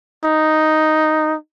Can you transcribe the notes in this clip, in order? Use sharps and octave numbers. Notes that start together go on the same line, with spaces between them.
D#4